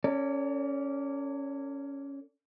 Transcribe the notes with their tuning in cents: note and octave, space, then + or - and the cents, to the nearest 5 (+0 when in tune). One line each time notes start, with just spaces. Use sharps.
C#4 +0 A4 +45 D5 -25